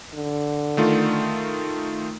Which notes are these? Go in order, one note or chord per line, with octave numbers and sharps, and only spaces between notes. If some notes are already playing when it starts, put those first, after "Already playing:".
D3
D#3 A3 F4